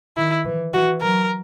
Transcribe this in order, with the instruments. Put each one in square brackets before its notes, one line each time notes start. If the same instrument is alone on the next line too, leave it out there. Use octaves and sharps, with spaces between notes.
[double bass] D#3 [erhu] E4
[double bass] E3
[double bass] E3 [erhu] F#4
[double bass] F#3 [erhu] A#4